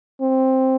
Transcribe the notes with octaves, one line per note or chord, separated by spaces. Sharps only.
C4